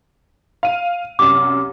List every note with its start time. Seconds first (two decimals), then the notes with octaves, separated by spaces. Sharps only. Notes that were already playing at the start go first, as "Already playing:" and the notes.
0.63 F5 D#7
1.19 C2 F#2 D6